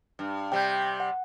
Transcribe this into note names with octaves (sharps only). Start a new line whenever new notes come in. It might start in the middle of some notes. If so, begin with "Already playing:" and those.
G2
C3 G3 G5 G6
F#5